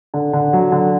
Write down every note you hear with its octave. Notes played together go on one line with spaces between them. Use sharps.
D3
D3
F#3
D3